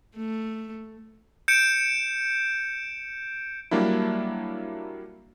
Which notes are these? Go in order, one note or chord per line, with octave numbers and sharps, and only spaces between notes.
A3
G6 C#7 D7 E7
F#3 G3 A#3 D4 E4